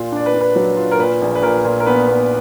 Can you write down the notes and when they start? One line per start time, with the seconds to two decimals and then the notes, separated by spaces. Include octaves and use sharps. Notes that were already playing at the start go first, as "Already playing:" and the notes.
Already playing: A#2 F4
0.12 D4 D5
0.26 B4
0.34 D4
0.41 B4
0.56 F#3
0.77 F4
0.91 A#4
0.99 A#2 B4
1.22 A#1
1.35 B4
1.42 A#2 A#4
1.65 A#2
1.80 A#4
1.86 B3 B4
2.08 B3